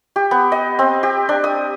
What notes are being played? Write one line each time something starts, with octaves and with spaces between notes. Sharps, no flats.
G4
B3
D#5
C4
G4
D4
D#6